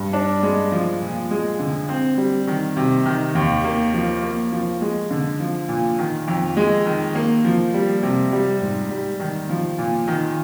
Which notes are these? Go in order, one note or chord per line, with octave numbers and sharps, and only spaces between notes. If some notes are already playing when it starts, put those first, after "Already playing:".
Already playing: G2
D4
G#3
F3
A#2
G#3
D3
C4
G3
D#3
C3
D#3
D#2
A#3
F3
A#3
F3
G#3
D3
F3
A#2
D#3
F2
G#3
D#3
A#3
F3
G3
C3
G3
G#2
G3
D#3
F3
A#2
D#3